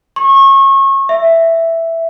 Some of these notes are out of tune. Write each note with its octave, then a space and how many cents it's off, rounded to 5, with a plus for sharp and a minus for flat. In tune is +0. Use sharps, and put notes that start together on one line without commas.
C#6 -30
E5 +5